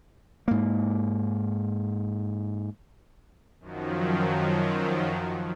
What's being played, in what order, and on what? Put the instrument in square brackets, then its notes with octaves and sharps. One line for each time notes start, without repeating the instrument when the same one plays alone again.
[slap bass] G#2 A#3
[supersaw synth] F#2 D#3 F3 F#3